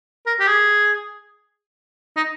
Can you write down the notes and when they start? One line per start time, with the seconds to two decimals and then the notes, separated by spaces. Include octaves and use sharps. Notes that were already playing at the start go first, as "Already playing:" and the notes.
0.26 A#4
0.40 G4
0.48 G#4
2.17 D#4